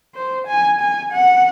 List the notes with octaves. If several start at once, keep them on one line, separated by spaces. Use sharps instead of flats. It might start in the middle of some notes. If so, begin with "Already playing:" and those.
C5
G#5
G#5
F#5